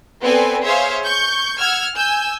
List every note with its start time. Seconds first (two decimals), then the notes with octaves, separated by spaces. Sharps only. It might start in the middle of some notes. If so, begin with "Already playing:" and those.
0.23 B3 C4 A4 B4 D5 G#5
0.63 G#4 C5 C#5 E5 F5
1.03 C#6 G6
1.59 F#5 E6 F6 G#6
1.95 G#5 E6 G6